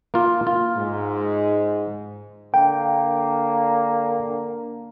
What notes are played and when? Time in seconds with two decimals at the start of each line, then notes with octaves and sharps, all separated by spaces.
0.14 A#3 F4
0.47 F4
0.77 G#2
2.54 D3 A#3 G5